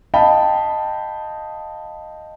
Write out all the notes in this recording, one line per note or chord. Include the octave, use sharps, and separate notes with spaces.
D#5 F5 G5 A5 B5